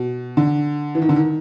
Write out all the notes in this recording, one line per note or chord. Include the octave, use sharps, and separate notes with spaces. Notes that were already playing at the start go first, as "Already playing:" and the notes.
Already playing: B2
D3
E3
D#3
D3
D#3